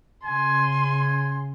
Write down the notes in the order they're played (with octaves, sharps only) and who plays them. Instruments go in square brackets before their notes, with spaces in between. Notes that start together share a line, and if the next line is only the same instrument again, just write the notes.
[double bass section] C#3 [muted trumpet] G#5 [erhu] C6